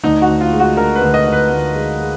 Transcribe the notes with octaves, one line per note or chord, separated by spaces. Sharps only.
D2 D#4
F#4
D2
F4
G#3
F#4
D3 A#4
B4
D2
D#5
D3
B4
D2
G#3
G#3